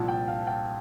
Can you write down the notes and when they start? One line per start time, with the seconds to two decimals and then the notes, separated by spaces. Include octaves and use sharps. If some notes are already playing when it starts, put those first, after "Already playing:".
Already playing: C2 A#2 F3 A5
0.08 G5
0.28 F5
0.47 G5